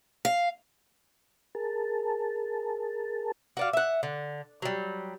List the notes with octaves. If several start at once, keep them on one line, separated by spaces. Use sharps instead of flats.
F5
G#4 A#4 A5
F#4 D5 F5
E5 F#5
D3
F#3 G3